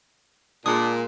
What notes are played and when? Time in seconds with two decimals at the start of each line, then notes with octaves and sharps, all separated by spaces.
0.66 A#2 G#3 D4 G#5 D#6